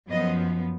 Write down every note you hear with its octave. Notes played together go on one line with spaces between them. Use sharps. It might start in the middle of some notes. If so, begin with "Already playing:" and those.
F#2 F3 B3 D#5